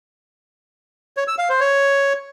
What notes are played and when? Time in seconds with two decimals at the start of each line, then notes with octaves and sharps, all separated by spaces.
1.17 C#5
1.28 E6
1.39 F5
1.49 C5
1.60 C#5